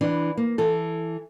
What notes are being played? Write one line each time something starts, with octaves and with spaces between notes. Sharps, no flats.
E3 D4
A#3
E3 A4